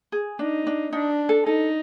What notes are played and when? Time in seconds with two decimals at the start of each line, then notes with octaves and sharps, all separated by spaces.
0.12 G#4
0.39 D4 D#4
0.67 D4
0.93 D4 D#4
1.29 A4
1.46 D#4 A4